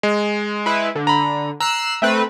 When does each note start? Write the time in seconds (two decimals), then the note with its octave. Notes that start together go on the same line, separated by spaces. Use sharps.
0.03 G#3
0.66 E4 B4
0.95 D3
1.07 A#5 B5
1.60 A#5 E6 F#6 C7
2.02 A3 C4 B4